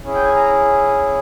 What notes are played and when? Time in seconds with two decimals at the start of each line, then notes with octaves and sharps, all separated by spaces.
0.03 C#4 E4 G#4
0.14 G5
0.25 G#5
0.35 A#5